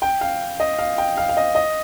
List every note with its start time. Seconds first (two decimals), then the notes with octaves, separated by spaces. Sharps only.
0.02 G5
0.21 F5
0.60 D#5
0.79 F5
0.98 G5
1.17 F5
1.29 F5
1.37 D#5
1.55 D#5